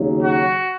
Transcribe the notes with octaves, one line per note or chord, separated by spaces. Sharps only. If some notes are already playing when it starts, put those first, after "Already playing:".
Already playing: D#2 C#3 F#3
F#4